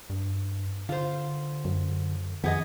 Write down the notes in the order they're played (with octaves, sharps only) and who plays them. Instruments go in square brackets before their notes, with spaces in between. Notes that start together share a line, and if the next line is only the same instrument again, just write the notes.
[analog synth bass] G2
[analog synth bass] D3 [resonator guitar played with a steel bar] F4 C5
[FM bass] F#2
[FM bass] F2 [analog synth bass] D#3 [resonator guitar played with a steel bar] B3 G#4 D#5